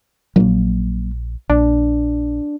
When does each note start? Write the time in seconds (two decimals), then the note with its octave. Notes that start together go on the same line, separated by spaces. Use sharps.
0.36 A#1 F#3 A#3
1.50 A#1 D4